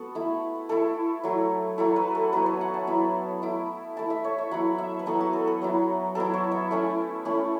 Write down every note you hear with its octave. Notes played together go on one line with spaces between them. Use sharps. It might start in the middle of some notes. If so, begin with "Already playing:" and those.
Already playing: B3 F#4 A4
A3 E4
A3 E4 A4
F#3 A3 E4
F#3 A3 E4 A4
B4
A4
F#3 B3 E4 B4
C#5
F#5
A5
F#3 B3 E4
A3 E4
A3 E4 A5
E5
C#5
E5
F#3 B3 E4 F#5
E5
B4
F#3 B3 E4 A4
F#4
A4
A4
F#3 B3 E4
F#3 B3 E4 A4
C#5
E5
A3 C#4 E4
A3 C#4 E4